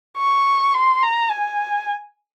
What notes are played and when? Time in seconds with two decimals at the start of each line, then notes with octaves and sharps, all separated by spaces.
0.18 C#6
0.74 C6
1.03 A#5
1.30 G#5